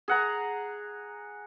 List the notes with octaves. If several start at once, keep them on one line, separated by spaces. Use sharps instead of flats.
G#4 F#5 A#5